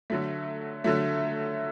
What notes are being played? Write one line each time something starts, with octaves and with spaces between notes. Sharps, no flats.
D3 F#3 A3
D3 F#3 A3